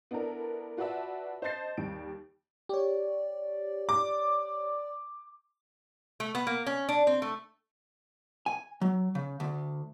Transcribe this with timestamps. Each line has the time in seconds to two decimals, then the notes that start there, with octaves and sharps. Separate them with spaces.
0.11 B3 D4 E4 A4 A#4
0.77 F4 F#4 B4 D5 E5 A5
1.42 C5 D#5 A5 G6 A6 C7
1.77 D#2 G3 D7
2.69 G4 C#5 D5
3.89 D6
6.20 A3
6.35 B3
6.47 A#3
6.66 C#4
6.89 D4
7.07 C4
7.22 A3
8.46 G#5
8.81 F#3
9.15 C#3
9.40 D2